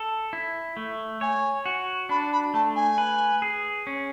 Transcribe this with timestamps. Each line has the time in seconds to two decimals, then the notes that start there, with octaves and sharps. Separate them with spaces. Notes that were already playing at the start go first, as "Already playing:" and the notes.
Already playing: A4
0.33 E4
0.77 A3
1.21 C#5 G#5
1.66 F#4
2.09 D4 B5
2.32 B5
2.54 A3 A5
2.76 G#5
2.98 B4
3.42 G#4
3.87 C#4